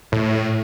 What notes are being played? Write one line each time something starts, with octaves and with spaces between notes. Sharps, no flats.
A2